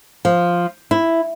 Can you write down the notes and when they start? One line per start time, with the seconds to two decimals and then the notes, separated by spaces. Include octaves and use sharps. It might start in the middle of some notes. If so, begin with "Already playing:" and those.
0.25 F3
0.91 E4